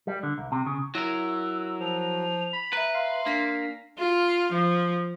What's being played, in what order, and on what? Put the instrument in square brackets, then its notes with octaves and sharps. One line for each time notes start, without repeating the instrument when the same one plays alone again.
[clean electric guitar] G3
D3
C2
C3
C#3
[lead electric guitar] F#3 A#4 [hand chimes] E4 [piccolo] E6
[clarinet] F3 [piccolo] F7
[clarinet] B5
[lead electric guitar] B4 [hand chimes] E5 A#5
[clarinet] F5 [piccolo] C6
[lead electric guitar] A#3 [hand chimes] D4 B6 C7
[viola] F4
F3